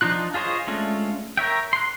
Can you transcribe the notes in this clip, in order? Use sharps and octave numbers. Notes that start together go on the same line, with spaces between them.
F3 D4 D#4 F4 F#6
F4 G#4 C5 C#5 D#5
G#3 A3 C#4 D4 F4
A#4 C#5 E5 G5
C6 F#6